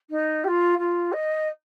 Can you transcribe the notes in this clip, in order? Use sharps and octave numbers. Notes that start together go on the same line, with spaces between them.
D#4
G4
F4
F4
D#5